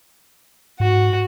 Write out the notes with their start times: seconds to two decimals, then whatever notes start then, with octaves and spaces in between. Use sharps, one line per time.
0.80 G#2 F#4